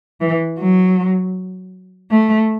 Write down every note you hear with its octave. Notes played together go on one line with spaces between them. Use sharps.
E3
F#3
A3